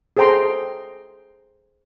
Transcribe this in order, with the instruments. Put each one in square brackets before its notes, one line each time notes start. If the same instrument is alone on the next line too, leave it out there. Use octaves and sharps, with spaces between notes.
[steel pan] G#4 A4 C5 G5 A#5 C6